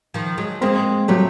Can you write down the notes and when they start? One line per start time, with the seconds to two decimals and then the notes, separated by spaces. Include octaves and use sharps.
0.14 D#3 F3
0.38 F#3 G#3
0.61 G#3 A#3 C4
1.08 F#3 G3 A3